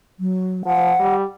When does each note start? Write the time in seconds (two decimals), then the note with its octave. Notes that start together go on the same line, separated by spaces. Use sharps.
0.20 F#3
0.65 F3 F#5
0.99 G3